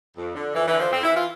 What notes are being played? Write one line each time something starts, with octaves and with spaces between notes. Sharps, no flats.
F2
D3
F2 E3
E3
D3
F3
F2 C4
E4
E3
F4